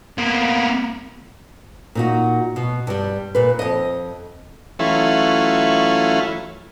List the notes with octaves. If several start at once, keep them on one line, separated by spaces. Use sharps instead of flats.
A#3 B3
A#2 D#4 F#4
B2
G2 G3
A#2 B4
F2 D#5
E3 F#3 A3 C#4 E4 F4